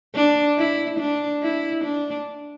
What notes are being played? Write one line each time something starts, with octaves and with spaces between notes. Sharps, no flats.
D4
E4
D4
E4
D4